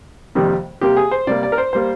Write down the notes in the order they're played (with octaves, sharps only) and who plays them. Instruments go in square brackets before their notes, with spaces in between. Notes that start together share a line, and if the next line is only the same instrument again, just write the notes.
[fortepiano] F2 C3 D#3 G3 A#3
C3 G3 A#3 G4
G#4
C5
C3 G3 A#3 D5
D5
A#4
C5
G3 A#3 C5